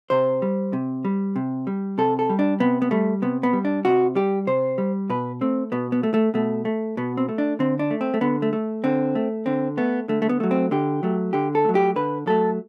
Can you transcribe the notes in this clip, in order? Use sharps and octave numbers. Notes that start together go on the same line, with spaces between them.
C3 C5
G3
C3
G3
C3
G3
C3 A4
A4
G3
D4
C3 B3
B3
G3 A3
C3 B3
B3
G3
D4
C3 F#4
G3 G4
C3 C5
G3
B2 B4
A3 C4
B2 B3
B3
A3
A3
B2 A3
A3
B2 B3
C4
A3
D4
D3 C4
D4
A3
C4
A3
D3 B3
A3
A3
D3 C4
A3
D3 C4
A3 B3
D3 A3
A3
B3
F#3 A3
C4
D3 G4
F#3 A3
D3 G4
A4
F#3 A3
G4
D3 B4
F#3 A3 A4